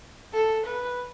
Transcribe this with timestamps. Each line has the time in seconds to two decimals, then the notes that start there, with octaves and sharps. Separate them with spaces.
0.33 A4
0.66 B4